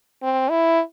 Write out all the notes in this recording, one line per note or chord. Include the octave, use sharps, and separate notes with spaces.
C4
E4